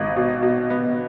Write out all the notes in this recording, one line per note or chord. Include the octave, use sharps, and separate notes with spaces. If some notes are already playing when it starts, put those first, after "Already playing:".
Already playing: G#1 D#5
B2
B2
B3